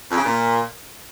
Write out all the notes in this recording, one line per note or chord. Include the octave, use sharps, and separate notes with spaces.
F2
C#3
A#2